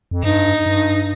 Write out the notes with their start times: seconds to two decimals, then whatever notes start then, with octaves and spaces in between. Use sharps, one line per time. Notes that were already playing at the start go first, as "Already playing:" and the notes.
0.11 F2
0.23 G2 D#4
0.66 G2